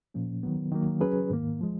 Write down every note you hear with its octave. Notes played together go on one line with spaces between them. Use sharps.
A#2 F3 A#3 C#4
D#3 F#3 B3
D#3 F#3 A#3
F#3 C#4 G#4 B4
G#2 D#3 A#3
F3 G#3